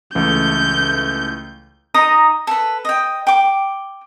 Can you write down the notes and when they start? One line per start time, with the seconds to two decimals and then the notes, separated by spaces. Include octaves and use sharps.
0.15 C#2 E3 A3 G6
1.94 D#4 D#5 A#5 D#6
2.47 A4 B4
2.85 D#5 G5
3.27 G5 D6